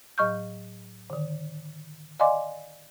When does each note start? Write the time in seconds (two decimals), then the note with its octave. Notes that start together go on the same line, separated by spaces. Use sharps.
0.18 A2 F#3 D#5 C#6 F6 G6
1.10 D3 D#3
2.20 D5 D#5 F5 G#5 C6 D6